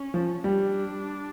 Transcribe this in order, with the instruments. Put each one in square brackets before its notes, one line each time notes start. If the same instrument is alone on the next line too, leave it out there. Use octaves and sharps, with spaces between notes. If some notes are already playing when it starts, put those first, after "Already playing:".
Already playing: [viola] C#4
[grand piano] F3
[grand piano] G3 [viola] D4